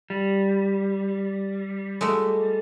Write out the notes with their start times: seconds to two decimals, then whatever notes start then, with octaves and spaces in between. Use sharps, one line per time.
0.10 G3
2.01 G#3 A3 F#4